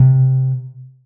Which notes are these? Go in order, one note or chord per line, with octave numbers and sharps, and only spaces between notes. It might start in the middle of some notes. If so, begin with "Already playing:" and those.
Already playing: C3